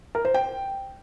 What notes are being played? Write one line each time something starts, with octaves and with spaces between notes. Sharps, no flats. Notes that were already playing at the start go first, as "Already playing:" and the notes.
A#4
C5
G5